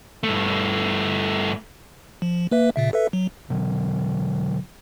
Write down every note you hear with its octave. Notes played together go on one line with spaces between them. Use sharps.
G2 A3
F3
A#3 B4 E5
A#2 C#3 E5
A4 B4 E5
F#3
B2 D3 F#3